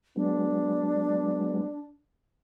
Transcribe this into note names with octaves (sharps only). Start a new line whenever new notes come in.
F#3 G#3 B3 D4